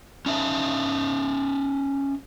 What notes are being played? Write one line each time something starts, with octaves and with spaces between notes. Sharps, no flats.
C#4 D#4 E5 A5